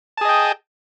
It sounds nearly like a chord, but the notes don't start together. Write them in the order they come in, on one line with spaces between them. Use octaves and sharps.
A5 G#4 D#5 G5